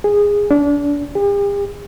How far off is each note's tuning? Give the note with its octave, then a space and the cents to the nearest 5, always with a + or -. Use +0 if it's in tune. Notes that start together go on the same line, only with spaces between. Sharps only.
G#4 -15
D4 -30
G4 +45